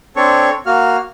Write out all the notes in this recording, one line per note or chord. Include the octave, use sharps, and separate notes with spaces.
C4 D4 A4 C#5 C#6
A#3 F#4 F6